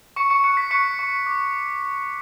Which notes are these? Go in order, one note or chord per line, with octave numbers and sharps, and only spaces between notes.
C#6 C#7
C#6 C#7
C#6 F#6 C#7
B6
C#6 F#6 C#7
C#6
D6